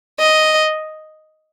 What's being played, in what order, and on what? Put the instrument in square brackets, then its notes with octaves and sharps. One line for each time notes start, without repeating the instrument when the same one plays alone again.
[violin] D#5